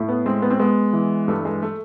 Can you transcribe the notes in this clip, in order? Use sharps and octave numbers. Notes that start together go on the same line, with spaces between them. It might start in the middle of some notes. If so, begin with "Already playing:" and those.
Already playing: A2
B3
G#3 C4
B3
C4
G#3 B3
E3
G2 A3
G#3
A3